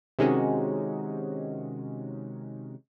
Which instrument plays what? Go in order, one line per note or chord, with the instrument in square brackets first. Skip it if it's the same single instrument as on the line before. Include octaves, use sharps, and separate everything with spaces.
[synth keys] C3 D#3 G#3 C#4 D#4 F#4